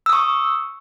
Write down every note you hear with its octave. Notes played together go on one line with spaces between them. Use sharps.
C#6 D#6 E6